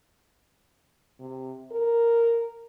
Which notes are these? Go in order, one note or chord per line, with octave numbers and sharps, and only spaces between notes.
C3
A#4